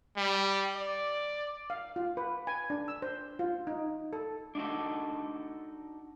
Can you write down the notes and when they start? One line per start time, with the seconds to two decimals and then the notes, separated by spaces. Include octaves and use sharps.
0.17 G3
0.76 D5
1.70 F5
1.96 F4
2.17 B4
2.47 G#5
2.70 D4
2.88 E6
3.02 C5
3.39 F4
3.67 D#4
4.13 A4
4.55 D4 D#4 F#4 A4